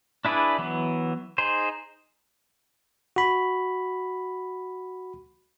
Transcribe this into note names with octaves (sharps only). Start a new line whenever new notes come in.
D4 E4 G#4 B4 D5
E3 F#3 B3
D#4 G#4 C5
F#4 B5